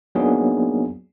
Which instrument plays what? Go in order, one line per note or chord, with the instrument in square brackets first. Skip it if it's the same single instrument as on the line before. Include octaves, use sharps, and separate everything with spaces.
[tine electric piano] F#3 A#3 B3 D4 D#4 G#4